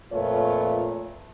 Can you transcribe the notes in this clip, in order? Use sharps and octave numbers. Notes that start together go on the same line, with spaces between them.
F2 A#2 A3 F4 B4 C#5